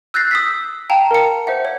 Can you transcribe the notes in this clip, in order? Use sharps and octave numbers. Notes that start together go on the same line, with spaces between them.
E6 F#6 G6 A6 A#6 C7
D#6 E6 B6
F5 G5 A5 A#5
A#4 C#7
C5 E5 F#5
C#5